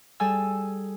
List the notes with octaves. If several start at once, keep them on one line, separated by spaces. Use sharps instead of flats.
G3 G#4 A4 G#5 E6